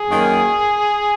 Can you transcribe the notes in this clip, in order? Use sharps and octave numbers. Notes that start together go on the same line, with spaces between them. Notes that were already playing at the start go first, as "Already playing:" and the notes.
Already playing: G#4
F#2 D#3 A#3